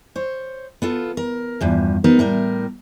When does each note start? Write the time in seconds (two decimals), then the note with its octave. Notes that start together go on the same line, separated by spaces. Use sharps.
0.16 C5 C#5
0.82 B3 F4 A4
1.17 A#4
1.61 E2 G2 F3
2.04 F#3 B3 D#4 A#4
2.19 A2 G3 A#4